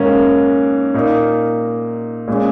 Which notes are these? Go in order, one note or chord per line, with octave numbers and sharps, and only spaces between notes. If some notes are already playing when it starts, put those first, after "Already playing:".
Already playing: G#2 D#3 A#3 C#4
A#2 A#3 D#4
A#2 G#3 C#4